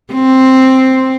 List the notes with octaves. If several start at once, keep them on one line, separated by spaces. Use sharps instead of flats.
C4